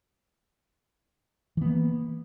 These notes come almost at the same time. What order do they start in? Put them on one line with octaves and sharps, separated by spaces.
E3 B3 A#3